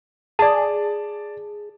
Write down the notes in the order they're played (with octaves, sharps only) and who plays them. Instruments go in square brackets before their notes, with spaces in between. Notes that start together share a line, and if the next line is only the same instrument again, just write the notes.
[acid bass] G#4 [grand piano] D5 A5